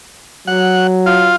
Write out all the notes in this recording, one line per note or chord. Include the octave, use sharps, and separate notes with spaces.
F#3 F#5
F4